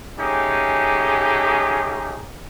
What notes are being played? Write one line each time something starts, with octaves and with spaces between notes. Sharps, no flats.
A3 C#4 D#4 G4 G#4